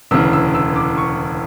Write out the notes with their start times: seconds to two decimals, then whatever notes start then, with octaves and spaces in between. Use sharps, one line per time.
0.11 E1 D2 C#3 E3 E6
0.33 E6
0.55 E6
0.76 D6
0.98 C#6